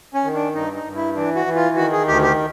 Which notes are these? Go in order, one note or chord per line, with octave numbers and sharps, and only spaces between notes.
C#4
D#3
D4
G2 D#4
D#4
G2
E4
E3 D4
F#4
E3
F4
D#3 F#4
G#4
D2 G4
G4